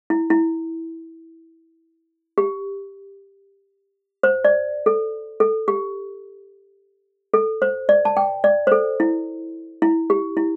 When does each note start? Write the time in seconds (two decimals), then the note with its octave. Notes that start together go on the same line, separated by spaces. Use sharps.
0.10 E4
0.30 E4
2.38 G4
4.23 C5
4.45 D5
4.86 A4
5.40 A4
5.68 G4
7.34 A4
7.62 C5
7.89 D5
8.05 A5
8.17 G5
8.44 D5
8.67 C5
8.72 A4
9.00 E4
9.82 E4
10.10 G4
10.37 E4